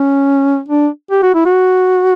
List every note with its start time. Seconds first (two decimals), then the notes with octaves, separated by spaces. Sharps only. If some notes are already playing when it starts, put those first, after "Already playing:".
Already playing: C#4
0.69 D4
1.11 G4
1.23 F#4
1.34 E4
1.45 F#4